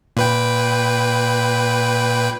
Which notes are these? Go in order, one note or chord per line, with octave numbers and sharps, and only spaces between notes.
A#2 B4 G5